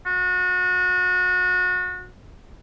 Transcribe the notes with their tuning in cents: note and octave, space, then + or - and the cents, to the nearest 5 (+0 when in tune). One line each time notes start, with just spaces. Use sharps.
F#4 -30